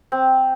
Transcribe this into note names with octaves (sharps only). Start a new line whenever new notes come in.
C4